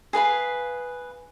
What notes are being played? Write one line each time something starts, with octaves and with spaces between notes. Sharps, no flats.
G#4 B4 F5 B5